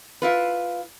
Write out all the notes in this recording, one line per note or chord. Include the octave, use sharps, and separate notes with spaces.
E4 F4 B4